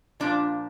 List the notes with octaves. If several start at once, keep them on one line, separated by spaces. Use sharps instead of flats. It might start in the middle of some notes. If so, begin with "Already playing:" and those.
A#2 F3 D4